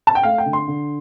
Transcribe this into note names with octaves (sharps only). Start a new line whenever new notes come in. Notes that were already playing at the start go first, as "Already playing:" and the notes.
A5
G5
A3 F5
G5
D3
C6
D3